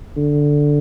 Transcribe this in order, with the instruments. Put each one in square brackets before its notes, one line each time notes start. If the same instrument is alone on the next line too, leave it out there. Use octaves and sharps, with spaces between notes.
[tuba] D3